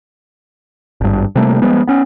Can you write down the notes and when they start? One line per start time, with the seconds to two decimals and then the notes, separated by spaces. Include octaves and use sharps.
1.01 G#1 G2
1.35 C3 G3 A3 A#3
1.62 F3 G3 G#3 B3
1.87 B3 C#4